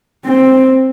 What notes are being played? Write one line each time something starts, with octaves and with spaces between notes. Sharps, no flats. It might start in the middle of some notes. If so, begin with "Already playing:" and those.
C4